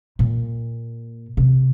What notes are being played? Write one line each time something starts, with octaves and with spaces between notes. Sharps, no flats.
A#2
C3